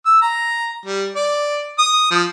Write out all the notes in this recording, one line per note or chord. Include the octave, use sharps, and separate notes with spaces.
E6
A#5
G3
D5
D#6
F3